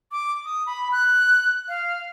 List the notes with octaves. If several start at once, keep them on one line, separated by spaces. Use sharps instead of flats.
D6
D#6
B5
F#6
F5